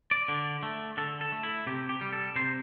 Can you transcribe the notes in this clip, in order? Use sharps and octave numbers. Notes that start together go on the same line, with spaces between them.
D5
D3
A3
D3 A4
A4
A3
E4
C3 G4
G4
G3
A4
C3 C5